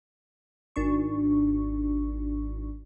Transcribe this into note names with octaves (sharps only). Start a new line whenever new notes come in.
G#1 D4 C#6